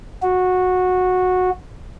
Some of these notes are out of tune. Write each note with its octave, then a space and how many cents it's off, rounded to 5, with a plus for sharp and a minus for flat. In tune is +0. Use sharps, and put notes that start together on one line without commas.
F#4 -15